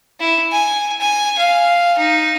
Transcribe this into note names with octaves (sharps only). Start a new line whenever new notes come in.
E4
G#5
G#5
F5
D#4